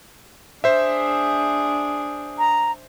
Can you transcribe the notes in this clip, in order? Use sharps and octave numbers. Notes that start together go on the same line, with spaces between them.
D4 G#4 C5 E5
A#5